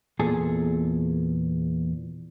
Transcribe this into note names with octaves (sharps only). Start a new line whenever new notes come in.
E2 A#2 G#4 A4